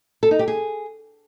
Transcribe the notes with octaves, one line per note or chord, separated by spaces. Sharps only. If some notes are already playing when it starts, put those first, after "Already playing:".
A4
D#4
G4
G#4